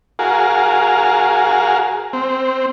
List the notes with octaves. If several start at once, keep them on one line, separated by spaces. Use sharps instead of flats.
F#4 G#4 A#4 F5
C4